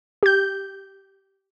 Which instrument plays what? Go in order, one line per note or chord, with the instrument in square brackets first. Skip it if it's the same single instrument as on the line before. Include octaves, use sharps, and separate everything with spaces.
[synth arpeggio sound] G4 G6